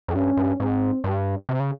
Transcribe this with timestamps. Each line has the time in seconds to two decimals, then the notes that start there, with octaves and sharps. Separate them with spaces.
0.08 F2
0.15 G2 C#4
0.37 G2
0.60 G#2 C4
1.04 G2
1.49 C3
1.60 C#3